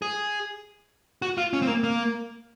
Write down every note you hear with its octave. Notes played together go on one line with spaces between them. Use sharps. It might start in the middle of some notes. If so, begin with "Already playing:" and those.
G#4
F#4
F4
C#4
C4
A#3
A#3